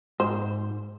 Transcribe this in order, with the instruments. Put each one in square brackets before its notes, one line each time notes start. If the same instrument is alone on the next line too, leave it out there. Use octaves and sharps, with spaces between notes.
[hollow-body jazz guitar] G#2 [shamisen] C5